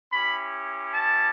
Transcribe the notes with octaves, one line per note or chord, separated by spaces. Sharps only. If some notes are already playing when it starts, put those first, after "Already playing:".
C#4 E4 G4 B5
A5